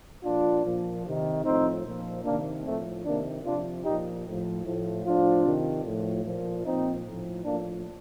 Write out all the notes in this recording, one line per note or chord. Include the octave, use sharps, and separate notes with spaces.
A#2 F3 D4 F4
A#2 F3
C3 D#3
A2 F3 C4 D#4
A#2 F3
C3 D#3 A#3 D4
A2 F3 A3 C4
C3 D#3 A#3 D4
C3 F3 D4 F4
A#2 F3 D#4 G4
A2 F3
A2 F3
A2 F3 D4 F4
C3 D#3
A2 F3
A#2 F3
A#2 F3 C4 D#4
A2 F3
A2 F3 A#3 D4